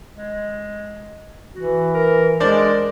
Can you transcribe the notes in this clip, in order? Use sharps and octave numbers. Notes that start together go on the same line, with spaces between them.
G#3
E3 F#4
A#4
G#3 D4 A#4 C5 D5